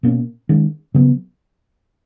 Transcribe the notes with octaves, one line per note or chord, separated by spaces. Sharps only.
B2 A#3 C#4
D#3 G#3 C#4
C#3 F#3 B3